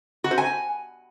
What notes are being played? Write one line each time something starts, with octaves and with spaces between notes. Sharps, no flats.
F#4
C5
G#5